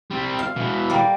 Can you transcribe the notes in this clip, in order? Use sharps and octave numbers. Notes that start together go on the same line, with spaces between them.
G3 C4
F5
B2 E3
G3 A#3